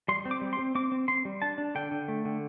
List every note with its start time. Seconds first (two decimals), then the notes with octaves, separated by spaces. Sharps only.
0.08 G3 C6
0.25 C4
0.31 D6
0.41 G3
0.53 C6
0.59 C4
0.75 C4 D6
0.92 C4
1.08 C4 C6
1.25 G3
1.42 D4 A5
1.58 D4
1.75 D3 G5
1.91 D3
2.08 A3
2.25 D3